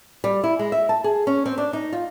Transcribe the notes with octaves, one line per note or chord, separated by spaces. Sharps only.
G3
E4
G#3
E5
A5
G#4
C#4
C4
D4
D#4
F4